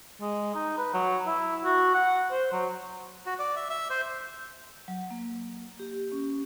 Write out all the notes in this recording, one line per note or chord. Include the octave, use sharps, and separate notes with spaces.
G#3
D#4
B4
F#3
E4
F#4
F#5
C5
F#3
F#4
D5
E5
E5
C5
F#3
A#3
G4
C#4